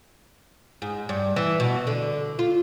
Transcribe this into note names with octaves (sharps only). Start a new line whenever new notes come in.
G#2
G2
E3
B2
D3
F4